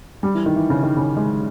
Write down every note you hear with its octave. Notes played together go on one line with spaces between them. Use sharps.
G3
E3
D#3
E3
C#3
D#3
C#3
G#3